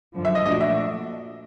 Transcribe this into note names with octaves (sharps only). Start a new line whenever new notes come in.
F#2 D3 F3
E5
D#5
A#2 F3 A3 D4 F#4 D#5
E5